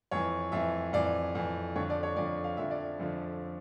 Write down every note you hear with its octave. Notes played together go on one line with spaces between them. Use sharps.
F2 E3 C#5
F2 E3 E5
F2 E3 D5
F2 E3
F2 D3 F3 C#5
D5
C#5
F2 D3 F3 D5
F5
F2 D3 F3 E5
D5
F2 D3 F3